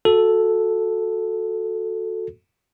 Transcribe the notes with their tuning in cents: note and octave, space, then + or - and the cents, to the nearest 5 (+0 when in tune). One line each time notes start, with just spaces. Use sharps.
F#4 -20 A4 +0